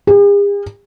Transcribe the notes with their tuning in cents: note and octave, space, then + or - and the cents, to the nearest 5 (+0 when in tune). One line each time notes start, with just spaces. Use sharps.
G#4 -45